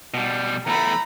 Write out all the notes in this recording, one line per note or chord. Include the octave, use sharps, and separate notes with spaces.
B2 G3
E2 A3 A#5 B5